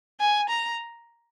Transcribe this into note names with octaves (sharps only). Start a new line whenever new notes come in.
G#5
A#5